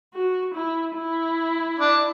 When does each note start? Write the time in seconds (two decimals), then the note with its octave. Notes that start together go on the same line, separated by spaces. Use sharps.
0.14 F#4
0.55 E4
0.96 E4
1.79 D4